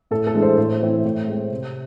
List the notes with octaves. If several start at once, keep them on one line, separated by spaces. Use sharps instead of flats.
A2 A4
A4
E3 G#3 D4
C5
A2 C5
E3 A3 C4 E4
A2
G#3 C4
C3